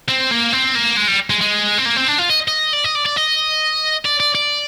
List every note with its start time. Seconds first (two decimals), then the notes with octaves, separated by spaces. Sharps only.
0.09 C4
0.31 A#3
0.53 C4
0.75 A#3
0.97 G#3
1.08 G3
1.30 G#3
1.41 G#3
1.78 C4
1.85 A#3
1.96 C4
2.07 D4
2.18 F4
2.29 D#5
2.48 D#5
2.73 D5
2.85 D#5
2.95 D5
3.06 D5
3.17 D#5
4.06 D5
4.20 D5
4.35 D5